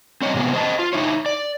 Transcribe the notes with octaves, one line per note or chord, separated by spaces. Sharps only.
C4 C#5 D#5
G#2 C3 F3 G#3 B3
C5 D#5 A5
F4
D#4 E4 C#5
D5